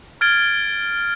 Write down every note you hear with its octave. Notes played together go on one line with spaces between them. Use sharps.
F6 G#6 A6 D7 G7